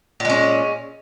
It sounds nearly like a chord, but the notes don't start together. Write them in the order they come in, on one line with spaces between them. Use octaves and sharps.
A#2 G#3 C#4